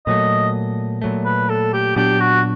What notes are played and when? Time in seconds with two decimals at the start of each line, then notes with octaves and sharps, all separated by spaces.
0.06 A#2 F#3 A3 D#5
1.02 A#2 F#3 A3
1.25 B4
1.49 A4
1.73 G4
1.96 A#2 F#3 B3 D4 G4
2.20 F#4